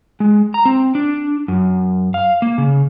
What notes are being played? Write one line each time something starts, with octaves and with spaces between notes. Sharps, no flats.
G#3
A#5
C4
D4
F#2
F5
A#3
C#3